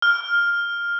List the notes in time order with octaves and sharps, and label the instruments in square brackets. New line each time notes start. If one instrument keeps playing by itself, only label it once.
[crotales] F6